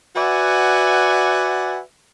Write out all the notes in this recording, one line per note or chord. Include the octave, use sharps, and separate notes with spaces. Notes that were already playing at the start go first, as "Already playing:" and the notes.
F#4 B4 D5 E5 F#5 G#5